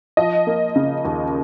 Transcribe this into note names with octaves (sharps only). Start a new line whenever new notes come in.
F3 D#5
A#3
C#3
D#2